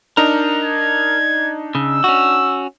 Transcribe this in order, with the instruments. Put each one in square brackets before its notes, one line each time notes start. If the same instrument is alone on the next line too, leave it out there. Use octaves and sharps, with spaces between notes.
[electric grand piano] D4 D#4 D#5 [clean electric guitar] A#4
[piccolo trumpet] G#6
[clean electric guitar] C#3 [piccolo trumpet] E6
[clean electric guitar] C#4 F#4